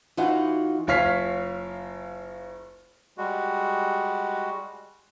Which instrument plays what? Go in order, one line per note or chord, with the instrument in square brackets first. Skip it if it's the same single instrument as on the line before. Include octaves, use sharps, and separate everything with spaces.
[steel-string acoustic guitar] E3 D#4 F4 F#4 F#5
[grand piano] F#1 F4 C#5 F6 B6 C7
[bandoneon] G3 G#3 F#4